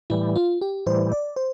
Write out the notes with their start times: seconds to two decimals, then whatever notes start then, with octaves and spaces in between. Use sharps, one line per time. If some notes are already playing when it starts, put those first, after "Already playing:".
0.10 A2 E3 G3 E4
0.36 F4
0.61 G4
0.86 A2 E3 G3 C5
1.12 D5
1.36 C5